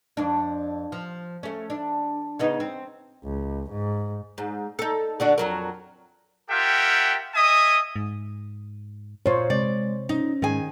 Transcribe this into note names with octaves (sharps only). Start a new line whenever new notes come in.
F2 D4
F3
A3 C#4
D4
C#3 B3 D#4
C4
C#2
G#2
G#2
D#4 A4
D3 D4 F#4
F2 F#3 A#4
F4 G4 A#4 E5 F#5 G5
D#5 E5 G#5 D#6
G#2
A#2 F4 C5 C#5
C3 G#3 D5
C#4 D#4
G#2 D#3 G#4 G#5